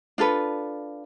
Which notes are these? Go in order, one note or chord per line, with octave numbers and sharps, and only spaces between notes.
D4 F4 A4 B4